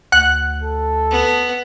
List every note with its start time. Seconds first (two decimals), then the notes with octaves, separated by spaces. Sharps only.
0.12 D2 F#5 F#6
0.63 A4
1.11 B3